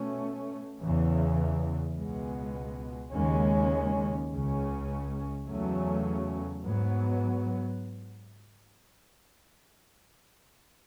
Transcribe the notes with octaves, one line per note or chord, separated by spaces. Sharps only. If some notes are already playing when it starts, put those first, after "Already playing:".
Already playing: B2 A3 C#4
E2 C#3 E3
C#2 B2 G#3 B3
D#2 C#3 G#3 C#4
C#2 C#3 G#3 C#4
E2 C#3 F#3 A3 C#4
G#2 F#3 B3